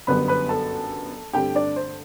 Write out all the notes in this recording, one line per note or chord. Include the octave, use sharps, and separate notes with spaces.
G1 F#2 D3 G3 B3 B4 B5
B4 B5
A4 A5
G2 D3 A3 C4 G4 G5
D4 D5
C5